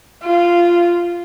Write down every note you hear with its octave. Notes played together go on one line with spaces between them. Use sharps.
F4